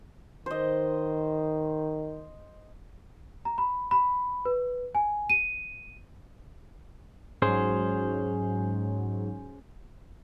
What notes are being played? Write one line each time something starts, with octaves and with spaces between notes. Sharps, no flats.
D#3 C5 D#5
A#5
B5
B5
B4
G#5
D#7
G#2 F#3 C#4 G#4 C5